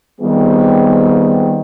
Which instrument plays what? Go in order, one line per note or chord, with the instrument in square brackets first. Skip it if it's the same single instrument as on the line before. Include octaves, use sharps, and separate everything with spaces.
[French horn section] D#3 G3 B3 C4 F4 G#4